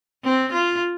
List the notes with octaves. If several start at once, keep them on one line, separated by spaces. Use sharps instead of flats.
C4
F4